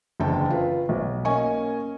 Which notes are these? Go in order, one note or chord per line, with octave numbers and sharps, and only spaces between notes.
F#1 E2 D3 G5 A5
F4 B4
B1
A#3 C#4 D#5 G#5 C#6